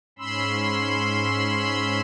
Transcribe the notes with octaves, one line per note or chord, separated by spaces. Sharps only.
G#2 C#4 B5 C6 E6